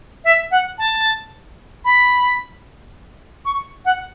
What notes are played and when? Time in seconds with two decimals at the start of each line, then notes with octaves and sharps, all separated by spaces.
0.24 E5
0.51 F#5
0.78 A5
1.85 B5
3.45 C#6
3.85 F#5